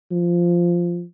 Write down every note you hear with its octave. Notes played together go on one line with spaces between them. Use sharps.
F3